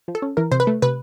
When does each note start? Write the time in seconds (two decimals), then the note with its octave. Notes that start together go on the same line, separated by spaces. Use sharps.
0.08 F3
0.15 A4
0.22 C#4
0.37 E3 A#4
0.52 C3 C5
0.60 B4
0.67 A3
0.82 C3 B4